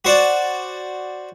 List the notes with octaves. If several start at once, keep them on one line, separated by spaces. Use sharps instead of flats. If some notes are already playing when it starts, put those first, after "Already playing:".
F#4 C5 D5